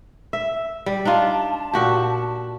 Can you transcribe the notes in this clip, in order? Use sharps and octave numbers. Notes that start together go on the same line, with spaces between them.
E5
G3
D4 D#4 F4 A5
A#2 F#4 G4